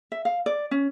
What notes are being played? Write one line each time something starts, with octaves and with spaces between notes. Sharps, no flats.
E5
F5
D5
C#4